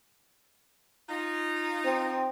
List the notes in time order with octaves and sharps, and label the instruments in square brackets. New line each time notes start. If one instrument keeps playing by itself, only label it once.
[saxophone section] D#4 F4
[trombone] C4